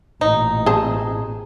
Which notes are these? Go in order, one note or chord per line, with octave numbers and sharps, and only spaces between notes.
A1 A#2 D#4
C4 G#4 C5 A5